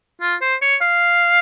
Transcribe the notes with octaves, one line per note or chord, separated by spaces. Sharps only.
F4
C5
C#5
F5